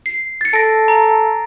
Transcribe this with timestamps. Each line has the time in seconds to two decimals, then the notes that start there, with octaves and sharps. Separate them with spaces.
0.06 C7
0.41 A6 C#7
0.53 A4 A#6 D7
0.88 A#5